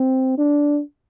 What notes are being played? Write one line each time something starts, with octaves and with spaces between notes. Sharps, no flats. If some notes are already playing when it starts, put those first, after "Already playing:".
Already playing: C4
D4